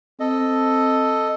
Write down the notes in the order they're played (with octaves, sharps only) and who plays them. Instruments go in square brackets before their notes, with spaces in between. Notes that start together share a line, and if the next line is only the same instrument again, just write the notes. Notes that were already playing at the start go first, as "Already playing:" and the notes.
[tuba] C4 [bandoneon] A4 D#5